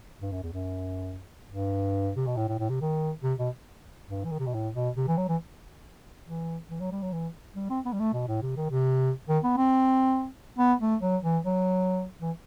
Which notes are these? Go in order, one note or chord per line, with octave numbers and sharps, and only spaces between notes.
G2
F#2
E2
F#2
G2
C3
B2
A2
A2
A2
C3
D#3
C3
B2
G2
E3
D#3
C3
B2
A2
B2
C3
E3
F#3
E3
E3
E3
F#3
G3
F#3
E3
G3
C4
B3
G3
A3
B2
A2
C3
D#3
C3
D#3
B3
C4
B3
A3
F#3
E3
F#3
E3